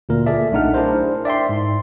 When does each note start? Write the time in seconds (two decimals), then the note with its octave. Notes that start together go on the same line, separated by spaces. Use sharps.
0.09 D2 A#2 A#4
0.26 G#4 A4 D5 E5
0.52 B1 A3 D4 D#4 F#5 F6
0.74 D4 E4 G#4 A#4 C5
1.25 D5 E5 G5 C6
1.49 G#2